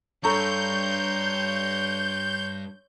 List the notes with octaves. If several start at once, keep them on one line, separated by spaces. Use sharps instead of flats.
G2 A4 C#5 A#5 C6 C#6 G6